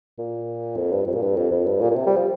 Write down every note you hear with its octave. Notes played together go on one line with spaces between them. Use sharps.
A#2
F2
G2
F2
A#2
G2
F2
F2
G2
A#2
A#2
C3
G3
F3